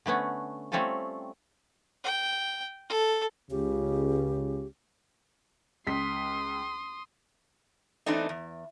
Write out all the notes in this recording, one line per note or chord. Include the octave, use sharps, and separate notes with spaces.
D3 A3 B3 C#4
G3 A3 C4 C#4 F4 A4
G5
A4
C#2 C#3 G4
C#2 C6 D#6 B6
E3 A3 B3 C4 D4 D#4
E2